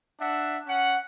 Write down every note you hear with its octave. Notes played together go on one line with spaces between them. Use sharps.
D4 E5 F#5
C#4 F#5